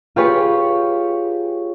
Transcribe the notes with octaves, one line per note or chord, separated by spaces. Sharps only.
F4 G4 G#4 B4 C#5